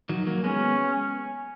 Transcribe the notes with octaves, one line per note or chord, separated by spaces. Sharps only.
D#3 F#3
F#3 A#3
G#3 B3 C#4